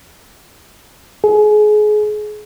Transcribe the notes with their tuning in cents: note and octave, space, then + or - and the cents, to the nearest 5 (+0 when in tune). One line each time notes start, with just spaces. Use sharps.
G#4 +30